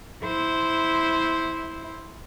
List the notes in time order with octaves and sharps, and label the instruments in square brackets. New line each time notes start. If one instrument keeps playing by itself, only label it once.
[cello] E4 C5